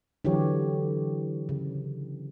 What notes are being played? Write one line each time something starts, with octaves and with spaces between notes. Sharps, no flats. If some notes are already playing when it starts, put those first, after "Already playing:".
D3 E3 F#3 G4 C#5
C#3